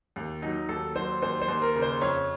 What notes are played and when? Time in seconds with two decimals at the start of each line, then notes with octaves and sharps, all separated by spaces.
0.16 D#2
0.42 F#3 D#4
0.69 D#2 A4
0.95 F#3 C5
1.22 D#2 C5
1.42 C5
1.48 D#2
1.62 A#4
1.75 C#3
1.82 C5
2.01 F2 C#5